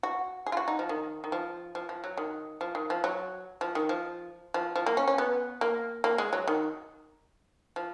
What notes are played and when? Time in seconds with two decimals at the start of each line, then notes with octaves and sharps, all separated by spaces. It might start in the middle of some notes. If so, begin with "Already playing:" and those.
0.03 F#4
0.46 G#4
0.52 F4
0.57 F#4
0.68 D#4
0.79 F3
0.89 D#3
1.24 D#3
1.32 F3
1.75 F3
1.89 F3
2.04 F#3
2.17 D#3
2.61 F3
2.75 D#3
2.90 F3
3.04 F#3
3.61 F3
3.75 D#3
3.89 F3
4.54 F3
4.76 F3
4.86 A#3
4.97 C#4
5.08 C#4
5.18 B3
5.61 A#3
6.04 A#3
6.18 G#3
6.33 F#3
6.48 D#3
7.76 F3